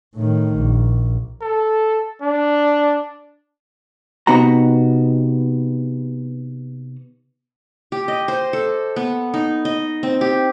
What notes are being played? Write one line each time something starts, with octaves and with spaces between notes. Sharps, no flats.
A2 D#3
A#1
A4
D4
C3 B3 D#4 F#4 A#5
G4
D#5
C5
A4
B3
D#4
D#5
C4
G4